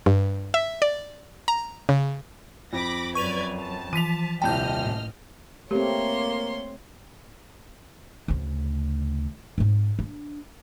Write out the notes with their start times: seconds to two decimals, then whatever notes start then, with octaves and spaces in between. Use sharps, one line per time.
0.06 G2
0.54 E5
0.82 D5
1.48 A#5
1.89 C#3
2.73 F2 B5 D6 A#6
3.15 F#2 B4 D5 C#6 G#6 D#7 F7
3.57 A5
3.93 E3 F3 B6 D#7 F7
4.42 D#1 C2 D#5 G5 A5 F6 G6
4.79 A1
5.71 A3 A#3 C4 G4 C#5 C6
8.28 D2 C#3
9.58 G#2 C4
9.99 D4